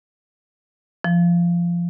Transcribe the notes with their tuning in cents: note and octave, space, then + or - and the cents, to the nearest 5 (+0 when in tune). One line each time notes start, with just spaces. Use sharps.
F3 -20